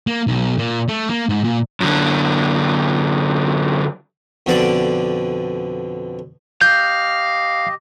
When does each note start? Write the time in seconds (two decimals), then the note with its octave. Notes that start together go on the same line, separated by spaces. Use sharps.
0.07 A#3
0.27 B1
0.58 A#2
0.88 A3
1.10 A#3
1.29 G#2
1.44 A#2
1.81 F#2 D3
4.46 F2 B2 D3 D5 D6
6.61 G4 D#5 F5 G6